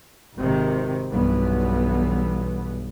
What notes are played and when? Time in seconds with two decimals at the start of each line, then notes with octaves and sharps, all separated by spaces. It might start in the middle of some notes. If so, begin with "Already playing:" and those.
0.38 G#1 C3 D#3
1.12 B1 G2 E3 B3